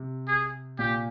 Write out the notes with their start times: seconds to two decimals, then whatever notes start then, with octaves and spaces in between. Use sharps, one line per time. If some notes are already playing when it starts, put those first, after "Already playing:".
Already playing: C3
0.27 G#4
0.79 A#2 G4